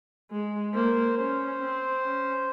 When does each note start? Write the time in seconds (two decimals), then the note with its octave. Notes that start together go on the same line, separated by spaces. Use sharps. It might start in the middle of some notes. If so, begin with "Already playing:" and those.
0.31 G#3
0.74 A#3 C5
1.17 C#4 C5
1.60 C4
2.03 C#4